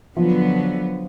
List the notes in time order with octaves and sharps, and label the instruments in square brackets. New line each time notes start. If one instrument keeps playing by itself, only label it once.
[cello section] D3 F#3 B3 [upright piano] F3